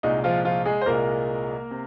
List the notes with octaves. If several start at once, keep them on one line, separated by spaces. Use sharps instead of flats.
C2 A#2 G#3 D#4
F3 F4
F3 F4
G#3 G#4
C5
C2 A#2 G#3 A#3 A#4
C3